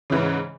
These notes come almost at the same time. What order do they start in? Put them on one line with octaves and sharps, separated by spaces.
C#3 E3 G#2